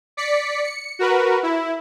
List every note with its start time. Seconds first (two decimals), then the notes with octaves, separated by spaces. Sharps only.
0.17 D5 B6 C#7
0.64 C#7
0.99 F#4 A#4 B4
1.43 E4